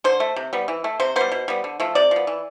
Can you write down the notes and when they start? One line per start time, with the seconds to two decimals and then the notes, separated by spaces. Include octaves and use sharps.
0.04 D3 C5
0.20 A3
0.36 C3
0.53 G3 B3
0.68 E3
0.84 A3
1.00 C3 C5
1.16 G3 B3 C5
1.32 B2
1.48 G3 B3
1.64 D3
1.80 F3 A3
1.95 C3 D5
2.11 F3 B3
2.27 E3